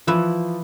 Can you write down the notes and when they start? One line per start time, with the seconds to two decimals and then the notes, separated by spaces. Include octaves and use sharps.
0.07 E3 F3 E4